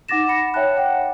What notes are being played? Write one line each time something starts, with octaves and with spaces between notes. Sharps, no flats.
D#4 F#5 D6 A6 A#6 E7
F#5 B5 C#7 E7
C#5 E5 G5 A5 F#6
F#5 G5